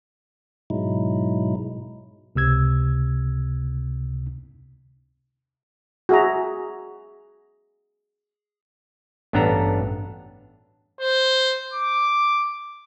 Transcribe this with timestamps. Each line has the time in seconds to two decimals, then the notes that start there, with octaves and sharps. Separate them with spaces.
0.70 G#2 B2 F#3 G#3 D#4 E4
2.35 C#2 C3 E6 G#6
6.09 F#4 G#4 E5 A#5
9.33 A1 G2 B3 D4 A4 A#5
11.01 C5
11.74 D6